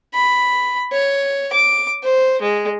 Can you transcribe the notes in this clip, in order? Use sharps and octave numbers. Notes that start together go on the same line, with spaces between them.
B5
C#5
D6
C5
G#3